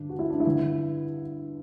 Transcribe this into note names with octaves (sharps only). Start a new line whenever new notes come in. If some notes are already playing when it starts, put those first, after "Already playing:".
Already playing: G2 D3 D4
F#4
E4
D4
E4
G2 D3